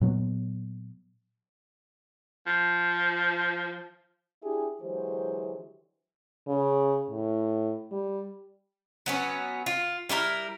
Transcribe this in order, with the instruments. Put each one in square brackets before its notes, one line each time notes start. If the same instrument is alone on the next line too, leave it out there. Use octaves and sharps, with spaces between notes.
[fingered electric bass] A#2 F#3 B3
[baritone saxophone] F3
[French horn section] D4 E4 G4 G#4
D3 E3 F#3 G#3 G4 C5
[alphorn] C#3
A2
G3
[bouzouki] F#3 B3 C#4
F4
G3 E4 G4 A#4